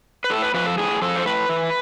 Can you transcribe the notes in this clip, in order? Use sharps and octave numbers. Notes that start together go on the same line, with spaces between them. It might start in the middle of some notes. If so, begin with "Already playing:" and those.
B4
A2 A4
B4
F3 B4
A4
A2 G#4
F3 A4
C5
A2 B4
E3